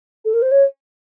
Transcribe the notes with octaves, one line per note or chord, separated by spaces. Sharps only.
A4
A#4
C5
C#5